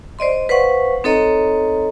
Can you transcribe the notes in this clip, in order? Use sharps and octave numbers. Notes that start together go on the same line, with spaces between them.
C5 D5 D#5 C6
B4 C5 F5 F#5 C#6
C4 D#4 A4 C#5 D#5 A#5